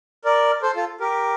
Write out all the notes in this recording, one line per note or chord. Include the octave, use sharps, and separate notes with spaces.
A#4 D5
A4 C5
F4 A4
G4 A#4